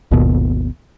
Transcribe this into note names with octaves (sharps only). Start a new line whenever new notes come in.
G#1 D#2 B2